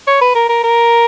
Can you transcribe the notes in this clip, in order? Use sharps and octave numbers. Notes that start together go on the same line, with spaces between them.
C#5
B4
A#4
A#4
A#4